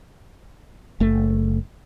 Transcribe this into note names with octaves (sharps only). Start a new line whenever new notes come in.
F#1 A3